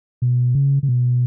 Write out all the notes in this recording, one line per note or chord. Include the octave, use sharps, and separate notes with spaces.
B2
C#3
C#3
B2